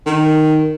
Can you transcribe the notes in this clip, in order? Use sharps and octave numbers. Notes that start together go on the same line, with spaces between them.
D#3